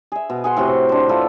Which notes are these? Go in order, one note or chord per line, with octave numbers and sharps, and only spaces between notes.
G#4 E5
B2
G#4 F#5 C6
A2 C3 F#4
D4 C5
E4 F4 A4 B4